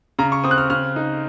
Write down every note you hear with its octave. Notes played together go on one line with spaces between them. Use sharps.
C#3 A#5
C#6
C4 D#6
F#6
F6
C#3 F6
D#4